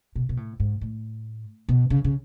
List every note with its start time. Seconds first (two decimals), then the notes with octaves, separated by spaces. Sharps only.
0.16 B2
0.29 B2
0.37 A2
0.60 G#2
0.81 A2
1.69 B2
1.90 C#3
2.04 C#3